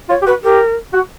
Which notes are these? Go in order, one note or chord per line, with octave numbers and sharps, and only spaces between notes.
F4 C#5
G4
F#4 B4
G4 A#4
F#4